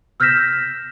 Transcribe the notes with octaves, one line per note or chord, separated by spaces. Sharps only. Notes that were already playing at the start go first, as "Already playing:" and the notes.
E6 F6 G6 A#6 B6 E7